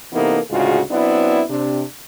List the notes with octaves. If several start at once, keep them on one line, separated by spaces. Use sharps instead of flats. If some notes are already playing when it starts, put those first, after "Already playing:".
C3 E3 A#3 B3 D#4 A4
D2 A2 C#3 G#3 F4 F#4
F#3 B3 C4 D4 E4
C3 D4